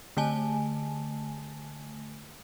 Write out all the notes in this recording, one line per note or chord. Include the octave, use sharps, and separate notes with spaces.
D3 A3 G#5 A5